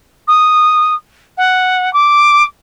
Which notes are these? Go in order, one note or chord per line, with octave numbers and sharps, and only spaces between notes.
D#6
F#5
D6